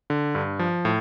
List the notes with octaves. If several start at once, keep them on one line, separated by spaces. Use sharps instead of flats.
D3
G2
F3
A2